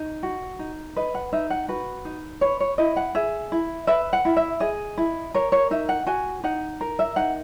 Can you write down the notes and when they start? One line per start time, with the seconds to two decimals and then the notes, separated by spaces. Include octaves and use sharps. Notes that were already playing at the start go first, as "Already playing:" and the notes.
Already playing: D#4
0.23 F#4
0.59 D#4
0.96 B4 D#5
1.14 F#5
1.33 D#4 E5
1.50 F#5
1.68 F#4 B4
2.05 D#4
2.41 B4 C#5
2.60 C#5
2.78 E4 D#5
2.96 F#5
3.15 G#4 E5
3.52 E4
3.87 B4 E5
4.13 F#5
4.25 E4
4.37 E5
4.60 G#4 D#5
4.97 E4
5.34 A#4 C#5
5.52 C#5
5.71 D#4 E5
5.89 F#5
6.06 F#4 G#5
6.44 D#4 F#5
6.81 A#4
6.99 E5
7.16 D#4 F#5